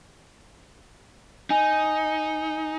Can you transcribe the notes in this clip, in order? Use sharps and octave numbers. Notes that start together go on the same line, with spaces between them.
D#4 G#5